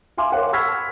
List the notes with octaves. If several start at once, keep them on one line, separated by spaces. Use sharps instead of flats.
E5 F5 G#5 C6 D6
A#4 C#5 F#5
B5 C#6 E6 F6 G#6 B6